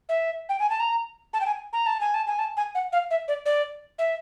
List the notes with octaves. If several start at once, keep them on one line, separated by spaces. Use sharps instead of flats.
E5
G5
G#5
A5
A#5
A5
G5
G#5
A#5
A5
G#5
A5
G#5
A5
G#5
F#5
F5
E5
D5
D5
E5